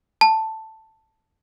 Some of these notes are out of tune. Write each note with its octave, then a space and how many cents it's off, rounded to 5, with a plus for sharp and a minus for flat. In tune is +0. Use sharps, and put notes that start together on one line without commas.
A5 +5